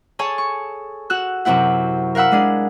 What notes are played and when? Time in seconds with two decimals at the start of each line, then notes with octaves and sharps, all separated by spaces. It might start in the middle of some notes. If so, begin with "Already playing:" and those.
0.19 G#4 A4 C#5 G#5 A5
0.38 C#6
1.10 F#4 E6 F#6
1.45 F#2 C3 C4 E4 F#5
2.15 A#4 F5 F#5 B5 E6
2.31 G#3 D4 G#4